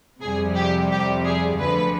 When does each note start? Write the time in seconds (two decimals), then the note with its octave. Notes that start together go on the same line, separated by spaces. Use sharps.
0.21 F2 C3 G3 G#4
0.55 G4
0.90 G4
1.25 G#4
1.60 D2 D3 F3 B4